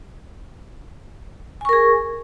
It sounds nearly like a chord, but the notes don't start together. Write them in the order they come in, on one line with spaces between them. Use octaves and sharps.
G#5 C#6 A#4 G#4